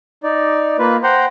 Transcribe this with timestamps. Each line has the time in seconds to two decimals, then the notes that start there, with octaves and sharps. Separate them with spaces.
0.23 D#4 D5
0.79 A#3 F4 B4
1.04 C5 F#5 G5 A#5 C6